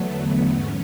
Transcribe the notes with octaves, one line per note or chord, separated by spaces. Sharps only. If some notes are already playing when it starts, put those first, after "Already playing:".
Already playing: E2 D3 F#3 A3 B3
G#2 C#4